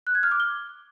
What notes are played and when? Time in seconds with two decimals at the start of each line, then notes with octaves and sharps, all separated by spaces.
0.07 F#6
0.15 G#6
0.23 F6
0.31 D6
0.40 G7